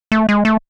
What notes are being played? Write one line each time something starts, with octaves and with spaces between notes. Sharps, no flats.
A3
G#3
A3